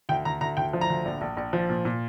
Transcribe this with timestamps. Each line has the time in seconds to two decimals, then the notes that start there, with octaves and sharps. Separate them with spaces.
0.09 D2 G5
0.25 D2 A#5
0.41 D2 A#5
0.57 D2 G5
0.73 F3
0.81 A#5
0.90 D2
1.05 A#1
1.21 A#1
1.37 A#1
1.53 F3
1.69 A#2
1.85 A#2